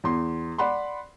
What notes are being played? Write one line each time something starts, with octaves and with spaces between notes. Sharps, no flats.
E2 C6
D5 F#5 B5 C6